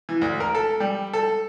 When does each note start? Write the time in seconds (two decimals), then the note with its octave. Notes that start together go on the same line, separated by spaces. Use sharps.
0.09 E3
0.21 D2
0.40 A#4
0.55 A4
0.80 G3
1.13 A4